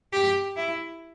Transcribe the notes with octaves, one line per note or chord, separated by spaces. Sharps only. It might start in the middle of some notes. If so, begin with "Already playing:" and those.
G4
E4